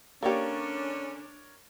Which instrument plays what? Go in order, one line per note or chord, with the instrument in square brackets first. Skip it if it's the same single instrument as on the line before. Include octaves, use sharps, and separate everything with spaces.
[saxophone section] D3 C#4 [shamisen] A#3 G4 [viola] D4 [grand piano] A#4 C#5 D5